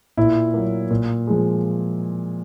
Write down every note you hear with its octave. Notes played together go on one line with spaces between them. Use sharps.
A#2 E4
F#3 A#3
A#2
F3 G#3